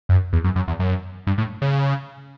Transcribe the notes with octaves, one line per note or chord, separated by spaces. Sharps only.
F#2
E2
F#2
F#2
E2
F#2
G2
A2
C#3